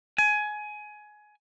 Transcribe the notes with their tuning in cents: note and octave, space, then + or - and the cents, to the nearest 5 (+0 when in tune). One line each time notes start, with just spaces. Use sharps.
G#5 +20